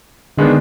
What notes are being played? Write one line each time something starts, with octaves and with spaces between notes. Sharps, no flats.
D3 D#3 G#3 B3 D4